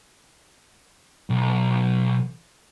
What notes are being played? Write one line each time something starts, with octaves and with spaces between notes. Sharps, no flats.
B1